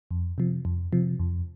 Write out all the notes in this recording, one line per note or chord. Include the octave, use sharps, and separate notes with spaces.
F2
C3 F3
F2
C3 F3
F2